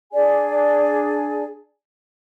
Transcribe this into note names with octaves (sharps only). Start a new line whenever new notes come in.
D4 G#4 D5 G#5